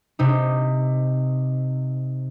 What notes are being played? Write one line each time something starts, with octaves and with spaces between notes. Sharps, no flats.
C3 D#4